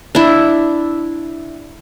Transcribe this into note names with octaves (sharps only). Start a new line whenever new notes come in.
D4 E4